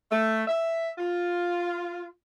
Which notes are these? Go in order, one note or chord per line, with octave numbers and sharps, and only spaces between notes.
A3
E5
F4